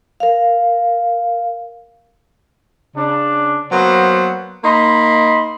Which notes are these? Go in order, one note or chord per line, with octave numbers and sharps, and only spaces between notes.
A#4 F5
C#3 D4
F#3 A#3 B3 C5
A#3 D#4 B5 C6